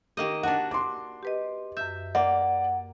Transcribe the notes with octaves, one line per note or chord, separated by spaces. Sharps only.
D#3 A#3 G4 D#5
D4 F#4 F#5 A5
C6 D6
G4 B4 D#5
F#2 E5 G6
A#3 D5 F#5